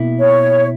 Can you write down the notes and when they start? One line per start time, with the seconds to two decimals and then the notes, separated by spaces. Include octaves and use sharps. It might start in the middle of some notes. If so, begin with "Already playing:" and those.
Already playing: B2 A#3 E4
0.19 C#5